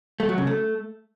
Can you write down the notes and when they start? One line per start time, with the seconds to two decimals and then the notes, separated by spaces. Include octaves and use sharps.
0.20 A3
0.29 F#3
0.38 C#3
0.47 A3